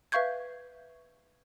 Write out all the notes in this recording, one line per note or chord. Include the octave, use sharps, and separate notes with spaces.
B4 E5 F5 C#6 G6 G#6